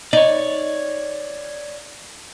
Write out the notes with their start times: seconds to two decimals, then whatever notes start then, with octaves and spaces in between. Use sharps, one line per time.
0.13 D#4 C#5 D5